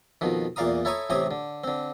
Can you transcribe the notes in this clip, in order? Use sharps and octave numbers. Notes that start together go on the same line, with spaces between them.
F2 B2 D#3
E2 A#2 D5 F5 A#5 D#6
E4 A4 C#5 A#5 C#6 D#6
A1 C3 C4 C#5 D#6
D3
D3 C4